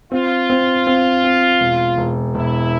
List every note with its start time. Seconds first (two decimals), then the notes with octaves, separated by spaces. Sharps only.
0.12 C4 F4
0.50 C4
0.87 C4
1.24 C4
1.61 E1
1.98 E1
2.35 E1 E4